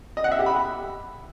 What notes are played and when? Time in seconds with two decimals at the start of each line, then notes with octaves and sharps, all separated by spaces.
0.17 D#5
0.24 F#5
0.32 E5
0.39 G4
0.46 B5